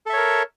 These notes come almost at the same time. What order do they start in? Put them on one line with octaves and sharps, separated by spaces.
A4 E5 C#5 A#4